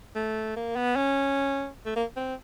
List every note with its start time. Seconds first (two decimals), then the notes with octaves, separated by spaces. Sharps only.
0.16 A3
0.57 A#3
0.76 B3
0.96 C#4
1.86 A3
1.96 A#3
2.17 C4